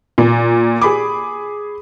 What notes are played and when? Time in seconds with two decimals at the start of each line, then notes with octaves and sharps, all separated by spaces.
0.18 A#2
0.81 G#4 B5 D6